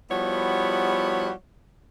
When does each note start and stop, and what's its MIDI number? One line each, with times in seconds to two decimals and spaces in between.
0.11 1.32 53
0.11 1.32 55
0.11 1.32 59
0.11 1.32 64
0.11 1.32 66
0.11 1.32 73